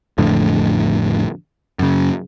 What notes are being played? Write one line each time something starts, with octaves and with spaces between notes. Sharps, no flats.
A1 F2 A2 D3
F#2 C#3